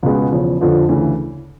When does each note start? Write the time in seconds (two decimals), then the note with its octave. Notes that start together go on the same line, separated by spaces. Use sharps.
0.03 C#2 B2 G#3 B3
0.32 E2 C#3 F3
0.61 F2 D3 F3
0.89 D2 C#3 E3